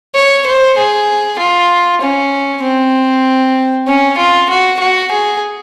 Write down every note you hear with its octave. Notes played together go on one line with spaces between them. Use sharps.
C#5
C5
G#4
F4
C#4
C4
C#4
F4
F#4
F#4
G#4